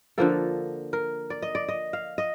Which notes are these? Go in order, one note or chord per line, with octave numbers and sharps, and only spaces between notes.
D3 F3 A#3 A4
A#4
D5
D#5
D5
D#5
F5
D#5